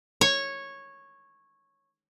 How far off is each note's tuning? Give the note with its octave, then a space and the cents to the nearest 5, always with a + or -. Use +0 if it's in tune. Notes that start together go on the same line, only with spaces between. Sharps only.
C#5 -10